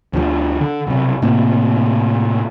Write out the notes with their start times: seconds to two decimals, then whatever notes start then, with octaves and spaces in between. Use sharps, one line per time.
0.13 D2 D3 F3
0.61 D3
0.87 B1 C3
1.22 A2 C3 A#3 C4